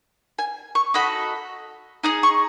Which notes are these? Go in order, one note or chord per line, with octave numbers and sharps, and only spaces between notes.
G#5
C#6
D#4 F#4 A4 B5
D#4 G#4 D#6
C#6